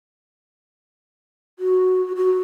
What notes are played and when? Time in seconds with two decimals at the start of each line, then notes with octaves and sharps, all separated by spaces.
1.59 F#4
2.16 F#4